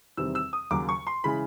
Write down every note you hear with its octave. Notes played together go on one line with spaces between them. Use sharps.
E2 C3 D#3 G3 C4 E6
E6
D#6
D#2 C#3 F#3 A#3 D6
C#6
C6
C#3 E3 G#3 B5